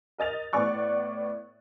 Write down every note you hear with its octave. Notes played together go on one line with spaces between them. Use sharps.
A#4 D#5 A6 F7
A2 B3 D5 C#6 F#6